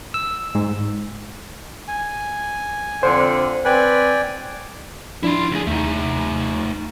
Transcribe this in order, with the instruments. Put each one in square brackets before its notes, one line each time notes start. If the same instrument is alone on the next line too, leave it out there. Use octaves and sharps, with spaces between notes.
[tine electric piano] E6
G#2
[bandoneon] G#5
[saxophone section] F2 D3 [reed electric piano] C5
[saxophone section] C4 B4 [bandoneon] D5 G5 G#5
[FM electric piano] F3 D4 [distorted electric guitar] E4 C6
[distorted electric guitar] D2 G#4
[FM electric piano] D#2 [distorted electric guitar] A3 D#4